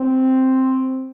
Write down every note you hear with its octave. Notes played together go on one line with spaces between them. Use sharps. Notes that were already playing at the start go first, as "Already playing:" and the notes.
Already playing: C4